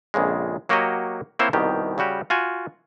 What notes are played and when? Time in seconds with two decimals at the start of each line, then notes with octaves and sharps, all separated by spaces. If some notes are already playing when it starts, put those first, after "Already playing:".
0.14 A#1 F2 C#3 G#3
0.69 F#3 A#3 F#4 G4 C#5 D#5
1.39 A#3 C4 E4 C5 C#5 E5
1.53 C2 B2 D#3 G4
1.98 C#3 G3 F#4 G4
2.30 F4 F#4 G#5